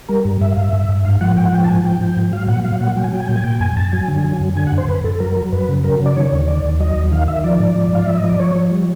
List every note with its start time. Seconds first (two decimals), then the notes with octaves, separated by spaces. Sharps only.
0.09 G3 A#4
0.25 G2
0.41 G2 E5
0.52 F5
0.57 G2
0.64 E5
0.73 G2
0.89 G2
1.05 G#2 F5
1.21 F3 F#5
1.37 G#2 G5
1.45 F#5
1.53 F3 G5
1.64 A5
1.68 G#2 G#5
1.84 F3 G5
2.01 F3
2.17 G#2
2.33 F#3 F5
2.48 A#2 F#5
2.64 F#3 F5
2.80 A#2 F#5
2.96 F#3 G5
3.04 G#5
3.12 F#3 G5
3.20 G#5
3.28 A#2 G5
3.36 G#5
3.44 A#2 G5
3.60 F#2 G#5
3.76 F#2 A5
3.92 F#3 G#5
4.08 D3
4.24 F#3
4.40 F#2
4.56 D3 G#5
4.67 F#5
4.72 F#2
4.78 C5
4.88 F#2 B4
5.04 F#2 A4
5.15 A4
5.20 F#3 A#4
5.36 F#3
5.52 F#2 B4
5.68 C#3
5.84 F#3 A#4
6.00 C#3
6.06 D5
6.16 D#3 C#5
6.32 D#2
6.48 D#3 D5
6.64 D#2
6.80 F#3 D#5
6.96 D#2
7.12 D#3 F5
7.28 D#3 E5
7.44 F3 D5
7.59 G#2
7.76 F3
7.92 G#2 F5
8.06 F3 E5
8.17 D#5
8.24 F3
8.29 D5
8.40 F3 C#5
8.55 F3
8.72 G3